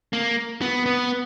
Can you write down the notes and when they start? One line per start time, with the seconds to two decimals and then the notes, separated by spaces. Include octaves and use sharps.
0.13 A#3
0.62 B3
0.86 B3